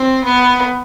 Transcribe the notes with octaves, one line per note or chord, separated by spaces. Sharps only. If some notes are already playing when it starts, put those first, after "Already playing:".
Already playing: C4
B3